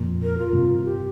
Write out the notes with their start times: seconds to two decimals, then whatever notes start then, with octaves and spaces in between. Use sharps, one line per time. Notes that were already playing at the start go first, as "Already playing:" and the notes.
Already playing: F2 A#2
0.23 A#4
0.38 F4
0.53 G2 C3
0.84 G4